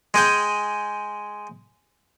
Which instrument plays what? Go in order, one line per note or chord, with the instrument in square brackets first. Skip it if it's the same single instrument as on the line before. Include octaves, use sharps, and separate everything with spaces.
[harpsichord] G#3 G#4 G5